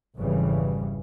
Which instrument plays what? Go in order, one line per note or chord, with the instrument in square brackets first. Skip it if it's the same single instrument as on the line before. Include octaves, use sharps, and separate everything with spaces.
[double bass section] G#1 F2 C#3 E3 G3